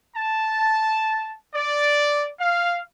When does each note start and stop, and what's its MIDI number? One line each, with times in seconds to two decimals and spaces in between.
0.16 1.34 81
1.54 2.29 74
2.39 2.81 77